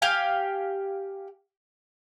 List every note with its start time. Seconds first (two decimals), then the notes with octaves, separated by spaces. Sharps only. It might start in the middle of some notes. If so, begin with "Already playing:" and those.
0.02 G4 F5 G#5